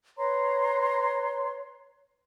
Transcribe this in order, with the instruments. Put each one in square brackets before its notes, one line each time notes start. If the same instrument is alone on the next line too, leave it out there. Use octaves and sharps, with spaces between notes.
[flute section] B4 C#5 A#5 C6